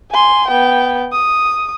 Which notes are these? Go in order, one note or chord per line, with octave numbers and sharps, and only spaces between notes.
G#5 C6
B3 G5
D#6